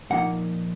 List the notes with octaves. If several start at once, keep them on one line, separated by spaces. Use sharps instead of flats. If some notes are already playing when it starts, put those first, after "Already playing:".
A#2 F3 A#3 D#4 F#5